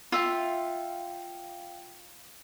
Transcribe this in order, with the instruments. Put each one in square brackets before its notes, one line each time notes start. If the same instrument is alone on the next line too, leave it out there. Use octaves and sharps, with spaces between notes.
[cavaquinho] F4 E5 [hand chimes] F5 G5